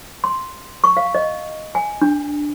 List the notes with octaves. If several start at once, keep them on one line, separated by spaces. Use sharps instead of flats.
C6
C#6
F5
D#5
G#5
D4